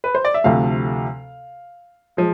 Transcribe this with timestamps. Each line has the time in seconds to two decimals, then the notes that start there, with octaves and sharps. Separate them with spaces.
0.04 B4
0.15 C5
0.25 D5
0.34 E5
0.44 D2 C3 F3 A3 F5
2.17 F3 G#3